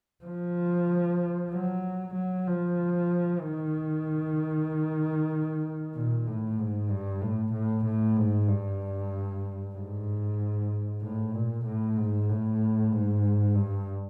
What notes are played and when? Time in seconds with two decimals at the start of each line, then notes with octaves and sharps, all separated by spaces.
0.25 F3
1.52 F#3
2.15 F#3
2.46 F3
3.41 D#3
5.95 A#2
6.27 A2
6.59 G#2
6.90 G2
7.21 A2
7.53 A2
7.85 A2
8.16 G#2
8.48 G2
9.75 G#2
11.02 A2
11.33 A#2
11.65 A2
11.97 G#2
12.28 A2
12.91 G#2
13.55 G2